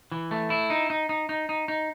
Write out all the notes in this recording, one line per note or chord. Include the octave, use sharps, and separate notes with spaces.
E3
A3
E4
D#4
D#4
D#4
D#4
D#4
D#4